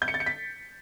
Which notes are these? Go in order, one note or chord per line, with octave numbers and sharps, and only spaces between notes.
G6
C#7
A6
C#7
B6